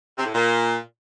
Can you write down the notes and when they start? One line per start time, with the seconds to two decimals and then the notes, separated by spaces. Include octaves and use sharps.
0.18 C3
0.25 A2
0.33 A#2